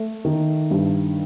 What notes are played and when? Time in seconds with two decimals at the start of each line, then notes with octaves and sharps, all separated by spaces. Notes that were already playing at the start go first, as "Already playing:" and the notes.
Already playing: A3
0.25 D#3
0.71 G2